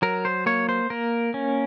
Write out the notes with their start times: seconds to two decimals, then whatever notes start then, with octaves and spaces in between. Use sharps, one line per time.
0.02 F#3 A#4
0.25 C5
0.46 A#3 C#5
0.69 C5
0.90 A#3 A#4
1.34 C#4